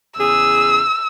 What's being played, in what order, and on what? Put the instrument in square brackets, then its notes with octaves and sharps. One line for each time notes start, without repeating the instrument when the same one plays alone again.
[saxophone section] E2 C#3 G#4 [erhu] E6